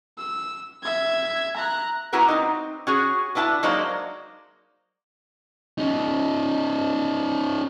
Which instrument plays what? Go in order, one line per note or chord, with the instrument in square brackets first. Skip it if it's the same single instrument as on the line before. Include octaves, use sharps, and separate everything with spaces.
[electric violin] E6
E5 G#6
A#5 F#6
[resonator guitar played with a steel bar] A#3 B3 E4 F#4 A#4
C4 D#4
C#4 F#4 G#4
B3 D4 E4 G5 A5
F#3 G#3 A#3 D#4 C5 D5
[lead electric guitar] C#4 D#4